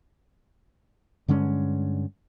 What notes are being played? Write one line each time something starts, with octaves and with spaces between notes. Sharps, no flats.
G2 D3 G#3 C#4